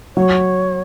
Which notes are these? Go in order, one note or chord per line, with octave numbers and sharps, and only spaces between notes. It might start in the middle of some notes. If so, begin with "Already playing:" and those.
F#3 C#5